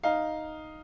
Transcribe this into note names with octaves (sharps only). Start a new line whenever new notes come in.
D#4 F5